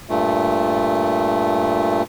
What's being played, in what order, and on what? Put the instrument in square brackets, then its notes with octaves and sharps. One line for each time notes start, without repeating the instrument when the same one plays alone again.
[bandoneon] G2 A#2 A3